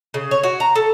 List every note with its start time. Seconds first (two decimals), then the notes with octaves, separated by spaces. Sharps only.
0.14 C#3
0.31 C#5
0.43 F#4
0.60 A#5
0.76 A4